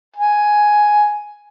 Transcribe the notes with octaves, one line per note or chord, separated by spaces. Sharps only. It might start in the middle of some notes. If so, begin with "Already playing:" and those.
G#5